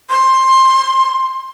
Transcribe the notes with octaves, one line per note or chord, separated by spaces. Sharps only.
C6